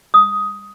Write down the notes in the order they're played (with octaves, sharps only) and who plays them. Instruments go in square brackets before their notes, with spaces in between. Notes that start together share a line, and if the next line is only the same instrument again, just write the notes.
[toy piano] D#6